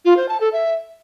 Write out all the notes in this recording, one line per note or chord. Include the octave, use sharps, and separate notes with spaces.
F4
C5
A5
A4
E5